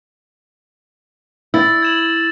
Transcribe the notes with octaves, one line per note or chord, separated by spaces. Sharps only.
E4 E6 A6
G#6 E7 F#7